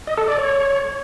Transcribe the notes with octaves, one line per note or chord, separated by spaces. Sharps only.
D#5
A4
D5
C#5